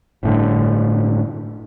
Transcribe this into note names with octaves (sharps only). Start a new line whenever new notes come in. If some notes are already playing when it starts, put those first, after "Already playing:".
G1 A2 D3